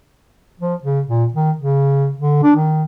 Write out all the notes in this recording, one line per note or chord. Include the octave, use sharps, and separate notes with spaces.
F3
C#3
A#2
D#3
C#3
D3
D4
D#3